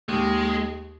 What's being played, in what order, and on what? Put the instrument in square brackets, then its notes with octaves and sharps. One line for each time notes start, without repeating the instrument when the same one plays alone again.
[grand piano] D#2 [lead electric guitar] G#3